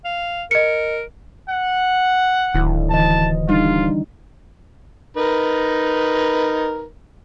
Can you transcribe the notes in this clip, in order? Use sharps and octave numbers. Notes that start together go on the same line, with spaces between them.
F5
A#4 D#5 C#7
F#5
D1 D#3 E4
D3 E3 D#5 A5
G3 D4 D#4 F4
D#4 A#4 B4